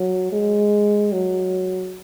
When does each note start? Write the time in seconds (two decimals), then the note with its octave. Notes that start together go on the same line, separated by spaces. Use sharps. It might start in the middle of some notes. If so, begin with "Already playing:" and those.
Already playing: F#3
0.32 G#3
1.12 F#3